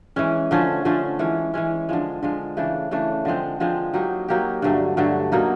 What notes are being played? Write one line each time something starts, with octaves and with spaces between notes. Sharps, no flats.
E3 G#3 C#4
D3 F3 A3 C#4
D3 F3 A3 C#4
E3 G#3 C#4
E3 G#3 C#4
D3 F3 G#3
D3 F3 G#3
C#3 E3 A3 D4
C#3 E3 A3 D4
D3 F3 G#3 C4
D3 F3 G#3 C4
F#3 A#3 D#4 G4
F#3 A#3 D#4 G4
G2 D3 F#3 A3
G2 D3 F#3 A3
B2 F#3 A#3 D#4